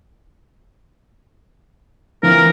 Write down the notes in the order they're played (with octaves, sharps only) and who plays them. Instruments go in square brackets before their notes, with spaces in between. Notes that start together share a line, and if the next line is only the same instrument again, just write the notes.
[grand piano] E3 F3 [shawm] A#4